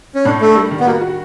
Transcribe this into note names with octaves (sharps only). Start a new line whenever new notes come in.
C#4
A2 D4
A3 D4
G3
D#3
B3
A#3 F#4
F#4